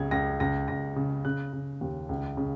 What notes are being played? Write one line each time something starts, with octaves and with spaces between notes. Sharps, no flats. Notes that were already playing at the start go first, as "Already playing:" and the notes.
Already playing: C#2 C#3 G#6
C#2 A#6
C#2 A#6
C#2 A#6
C#3
C#3 F#6
C#3
D#2
C#2
C#3